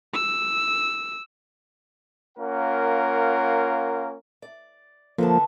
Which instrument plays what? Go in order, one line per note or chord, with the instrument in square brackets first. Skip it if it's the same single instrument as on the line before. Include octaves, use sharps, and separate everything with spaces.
[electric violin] E6
[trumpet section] A#3 C#4 F4 A#4 F#5
[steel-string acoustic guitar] D5
[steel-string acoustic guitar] D3 B3 A5 [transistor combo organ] F3 A#3